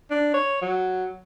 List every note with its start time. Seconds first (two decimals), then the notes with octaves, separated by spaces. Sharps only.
0.11 D4
0.34 C#5
0.62 F#3